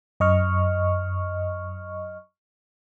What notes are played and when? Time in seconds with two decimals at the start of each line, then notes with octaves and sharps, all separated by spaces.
0.20 F#2 D#5 C#6 F6